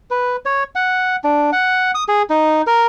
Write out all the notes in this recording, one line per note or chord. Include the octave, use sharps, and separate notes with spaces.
B4
C#5
F#5
D4
F#5
D#6
G#4
D#4
A#4